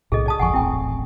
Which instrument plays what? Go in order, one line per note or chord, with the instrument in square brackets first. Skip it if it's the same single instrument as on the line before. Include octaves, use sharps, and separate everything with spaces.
[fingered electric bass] B1 A2 C3 [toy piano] G#4 A4 D#5
[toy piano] D5 A5 D#6
[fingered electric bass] G1 F2 F3 [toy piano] F#5 G#5 C#6
[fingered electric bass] D#1 A1 C4 [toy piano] E4 G5